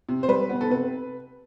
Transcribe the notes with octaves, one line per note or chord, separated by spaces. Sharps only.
C3
C5
G3 B4
B3
A4
C3 B4